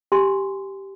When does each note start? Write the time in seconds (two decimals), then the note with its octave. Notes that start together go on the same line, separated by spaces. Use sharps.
0.12 G4 G#5 C6